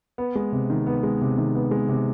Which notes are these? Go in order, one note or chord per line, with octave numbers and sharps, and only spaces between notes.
B3
G#3
C3
D#3
B3
G#3
C3
D#3
B3
G#3
C3